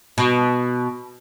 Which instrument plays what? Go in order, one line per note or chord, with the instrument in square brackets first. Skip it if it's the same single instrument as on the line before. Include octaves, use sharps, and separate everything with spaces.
[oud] B2